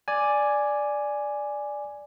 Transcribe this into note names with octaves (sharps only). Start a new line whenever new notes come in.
D5 G#5